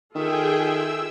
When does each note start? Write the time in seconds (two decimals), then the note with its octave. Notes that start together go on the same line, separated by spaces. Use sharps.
0.15 D#3 F4 G#4 A4 E5 G5
0.61 E6